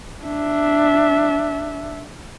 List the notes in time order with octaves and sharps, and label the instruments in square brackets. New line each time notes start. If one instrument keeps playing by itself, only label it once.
[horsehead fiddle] D4 E5